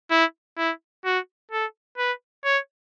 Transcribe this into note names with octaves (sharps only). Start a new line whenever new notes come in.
E4
E4
F#4
A4
B4
C#5